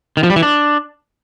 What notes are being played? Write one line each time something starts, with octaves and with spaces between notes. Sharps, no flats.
D#3
F3
G3
E3
D4